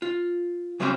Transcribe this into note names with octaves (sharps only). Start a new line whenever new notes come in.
F4
C#3 F#3 A#3 C4 C#4 C5